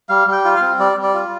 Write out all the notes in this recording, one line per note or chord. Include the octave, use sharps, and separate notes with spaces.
G3 F5
G3 G5
F4
C4 F5
G3 D5
G3
D5
F4